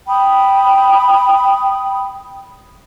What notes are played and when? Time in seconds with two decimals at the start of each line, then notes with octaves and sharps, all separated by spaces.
0.08 G5 B5 D#6